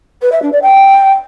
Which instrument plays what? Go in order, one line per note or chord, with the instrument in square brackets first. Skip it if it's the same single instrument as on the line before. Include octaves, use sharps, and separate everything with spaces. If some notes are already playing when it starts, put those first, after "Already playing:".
[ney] B4
E5
D4
D5
G5